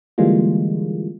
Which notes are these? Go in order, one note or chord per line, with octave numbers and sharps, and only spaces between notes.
D3 E3 G3 G#3 A#3 F4